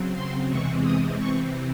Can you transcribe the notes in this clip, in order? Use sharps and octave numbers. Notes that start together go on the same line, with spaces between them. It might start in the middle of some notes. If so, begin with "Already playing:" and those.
Already playing: C#3 F#3 C4
C6
E2 C3 E3 G#3 C4 C#6
D#6
C3 E3 C4 C#6